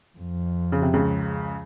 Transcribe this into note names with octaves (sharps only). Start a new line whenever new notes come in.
F2
C#3
C3
C#2 C#3